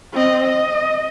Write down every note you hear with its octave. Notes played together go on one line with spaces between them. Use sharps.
C4 D#5
D#5